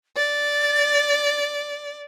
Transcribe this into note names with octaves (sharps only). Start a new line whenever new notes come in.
D5 A6